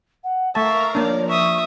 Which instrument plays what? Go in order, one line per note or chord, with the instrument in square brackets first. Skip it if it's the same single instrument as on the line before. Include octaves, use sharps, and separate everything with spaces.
[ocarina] F#5
[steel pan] A3 A5 [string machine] A#4 F5 A#5 [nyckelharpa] E5 [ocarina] C#6
[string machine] F3 [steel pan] A#3 D4 [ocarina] C#5 [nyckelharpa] D5
[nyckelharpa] E5 D#6 [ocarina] C#6